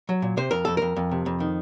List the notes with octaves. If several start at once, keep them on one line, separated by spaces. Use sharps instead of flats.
F#3
A#2
C3 C5
F2 A#4
F2 A4
F2 A#4
F2
C3
F2
D#3